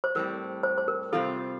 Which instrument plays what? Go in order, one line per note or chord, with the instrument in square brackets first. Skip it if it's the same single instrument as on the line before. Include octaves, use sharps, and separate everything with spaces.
[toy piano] C5
[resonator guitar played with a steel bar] A2 G3 C4 [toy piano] A#4
[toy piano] C5
C5
A#4
[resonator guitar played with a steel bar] C3 G3 C4 F4 [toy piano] A4